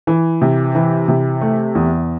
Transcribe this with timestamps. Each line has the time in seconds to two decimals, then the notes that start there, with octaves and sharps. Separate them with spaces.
0.07 E3
0.42 C3
0.75 E3
1.08 C3
1.41 A3
1.75 E2